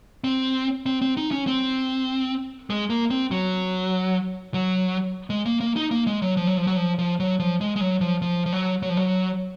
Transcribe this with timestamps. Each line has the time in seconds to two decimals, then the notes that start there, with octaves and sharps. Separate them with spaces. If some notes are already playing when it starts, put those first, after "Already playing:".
0.24 C4
0.86 C4
1.02 C4
1.17 D#4
1.32 C#4
1.47 C4
2.70 G#3
2.90 A#3
3.10 C4
3.31 F#3
4.54 F#3
5.30 G#3
5.46 A#3
5.60 A#3
5.76 D#4
5.91 A#3
6.07 G#3
6.22 F#3
6.37 F3
6.47 F#3
6.57 F3
6.67 F#3
6.77 F3
6.99 F3
7.20 F#3
7.40 F3
7.61 G#3
7.76 G#3
7.81 F#3
8.01 F3
8.22 F3
8.46 F3
8.52 F#3
8.83 F#3
8.90 F3
8.97 F#3